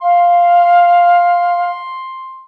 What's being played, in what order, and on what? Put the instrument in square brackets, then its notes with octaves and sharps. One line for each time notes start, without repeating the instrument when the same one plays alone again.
[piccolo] F5 [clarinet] C6